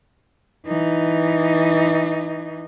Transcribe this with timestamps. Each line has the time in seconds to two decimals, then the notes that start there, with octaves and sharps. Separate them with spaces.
0.66 E3 D#4